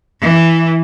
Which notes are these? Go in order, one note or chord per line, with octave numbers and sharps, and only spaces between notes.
E3